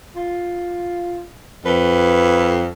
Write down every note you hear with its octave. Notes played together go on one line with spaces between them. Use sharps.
F4
F2 B4